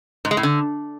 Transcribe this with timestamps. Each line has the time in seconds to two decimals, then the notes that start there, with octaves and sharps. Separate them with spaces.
0.25 G#2
0.31 G#3
0.37 A2
0.43 D3